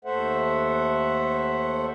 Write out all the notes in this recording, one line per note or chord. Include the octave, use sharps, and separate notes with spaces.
D#2 A3 A4 C5 E5 F#5